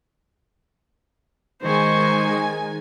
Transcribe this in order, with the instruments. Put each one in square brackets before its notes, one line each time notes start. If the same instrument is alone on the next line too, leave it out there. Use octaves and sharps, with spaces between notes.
[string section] D#3 G#3 G#5 [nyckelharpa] C5 C#6